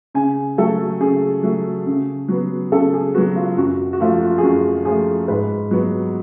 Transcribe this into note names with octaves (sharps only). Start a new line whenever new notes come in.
C#3 G#5
F#3 A3 A4
C#3 G#4
F#3 A3
C#3
F#3 B3
C#3 A4
G#4
F#3 B3 F#4
F4
F#2 F#4
F#4
F3 A3 F4
F#4
G#4
F#2 F#4
F3 A3 G#4
G#2 B4
F#3 B3